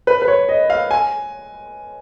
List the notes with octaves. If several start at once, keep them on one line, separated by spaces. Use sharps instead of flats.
B4
B4
C#5
D#5
F5
G#5